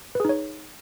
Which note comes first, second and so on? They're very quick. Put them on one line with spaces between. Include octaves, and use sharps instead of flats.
B4 G#4 D#4 C#5